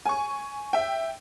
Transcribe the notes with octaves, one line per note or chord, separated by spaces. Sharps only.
G#5 C#6
E5 G5